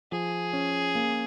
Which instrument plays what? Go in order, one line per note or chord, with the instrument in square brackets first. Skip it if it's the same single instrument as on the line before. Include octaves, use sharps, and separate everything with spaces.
[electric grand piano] F3 [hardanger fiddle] G#4
[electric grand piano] C#4
A#3